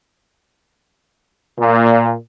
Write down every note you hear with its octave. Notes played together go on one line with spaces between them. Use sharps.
A#2